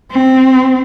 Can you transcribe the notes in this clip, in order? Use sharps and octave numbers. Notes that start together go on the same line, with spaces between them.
C4